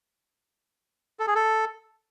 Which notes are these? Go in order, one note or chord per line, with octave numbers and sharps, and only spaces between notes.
A4
G#4
A4